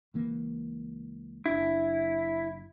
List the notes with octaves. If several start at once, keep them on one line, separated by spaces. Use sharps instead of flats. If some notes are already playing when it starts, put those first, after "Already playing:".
C#2 E3 A#3
F#1 D4 E4